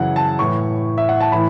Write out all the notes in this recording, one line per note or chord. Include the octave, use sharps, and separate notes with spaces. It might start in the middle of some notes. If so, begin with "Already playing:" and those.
Already playing: F#2 C#3 E3 F#5
A5
A2 E3 C#6
E5
F#5
A5
A2 E3 B5